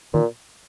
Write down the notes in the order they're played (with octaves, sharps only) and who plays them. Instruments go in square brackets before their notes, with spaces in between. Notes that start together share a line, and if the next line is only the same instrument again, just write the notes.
[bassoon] A#2 [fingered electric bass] D#3